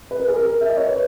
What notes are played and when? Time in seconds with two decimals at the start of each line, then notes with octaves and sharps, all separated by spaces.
0.11 B4
0.20 A#4
0.28 G#4
0.36 A#4
0.61 E5
0.69 D#5
0.77 C#5
0.87 B4